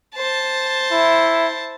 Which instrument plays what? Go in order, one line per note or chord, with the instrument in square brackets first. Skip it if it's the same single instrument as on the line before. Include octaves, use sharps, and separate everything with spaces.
[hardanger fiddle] C5 A5
[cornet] E4